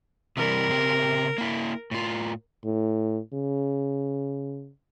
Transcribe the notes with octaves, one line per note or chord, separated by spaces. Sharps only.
C3 E3 G3 A#4
C#3 C4 G4
A#3 E4
A2 F4
A2
C#3